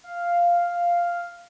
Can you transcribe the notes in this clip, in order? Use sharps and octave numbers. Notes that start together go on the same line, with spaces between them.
F5